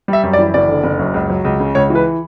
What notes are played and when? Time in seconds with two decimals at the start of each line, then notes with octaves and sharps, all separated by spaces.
0.08 G3 E5
0.23 F#2
0.33 D5
0.39 E3
0.54 F#1 D5
0.69 D3
0.83 F#1
0.99 F#2
1.14 C#2
1.30 F#3
1.44 C#2
1.60 C#3
1.75 C#2 C#5
1.90 E3
1.95 B4